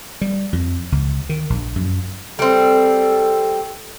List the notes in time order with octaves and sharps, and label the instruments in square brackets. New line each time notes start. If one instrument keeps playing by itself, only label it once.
[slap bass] G3
F2
C#2
D#3
A#1
F#2
[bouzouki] G3 C4 [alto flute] A4